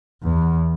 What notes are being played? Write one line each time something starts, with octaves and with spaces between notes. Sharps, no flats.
E2